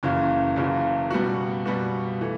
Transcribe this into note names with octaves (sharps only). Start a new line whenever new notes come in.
F#1 F#2 C#3 E3
F#1 F#2 C#3 E3
B2 G3 B3 F#4
B2 G3 B3 F#4
E3 A3